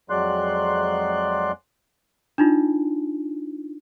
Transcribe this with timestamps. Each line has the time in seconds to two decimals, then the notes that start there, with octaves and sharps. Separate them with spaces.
0.10 F2 F#3 G#3 D5 C6 F#6
2.38 D4 D#4 F4